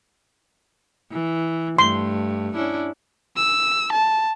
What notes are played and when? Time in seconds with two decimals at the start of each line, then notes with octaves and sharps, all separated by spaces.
1.12 E3
1.79 G2 A3 C6
2.54 C#4 D4 E4
3.36 E6
3.93 A5